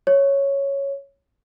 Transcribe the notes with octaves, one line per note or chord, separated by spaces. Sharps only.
C#5